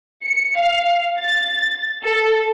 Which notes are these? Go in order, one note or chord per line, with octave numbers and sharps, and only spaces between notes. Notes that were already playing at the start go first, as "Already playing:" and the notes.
C#7
F5
A6
A4